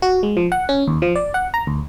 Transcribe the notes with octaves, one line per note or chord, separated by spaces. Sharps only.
F#4
G#3
F3
F#5
C#4
D#2
F3
D5
F#5
A#5
D2